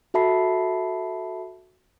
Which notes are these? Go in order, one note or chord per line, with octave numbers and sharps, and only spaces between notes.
F#4 A4 E5 A5 B5 C7